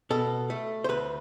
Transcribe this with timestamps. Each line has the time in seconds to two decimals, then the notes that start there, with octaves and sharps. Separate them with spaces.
0.10 B2 A4
0.50 A3
0.84 C5
0.89 D2 B4